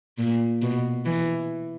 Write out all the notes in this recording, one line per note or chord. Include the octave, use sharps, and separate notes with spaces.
A#2
B2
E3